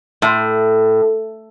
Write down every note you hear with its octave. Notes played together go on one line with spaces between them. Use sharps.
A2